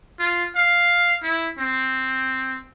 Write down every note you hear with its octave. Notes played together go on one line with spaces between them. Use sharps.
F4
F5
E4
C4